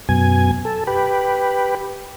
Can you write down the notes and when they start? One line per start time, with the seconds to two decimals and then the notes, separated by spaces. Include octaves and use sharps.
0.09 F#2 B2 G#5
0.65 A4
0.87 G4 B4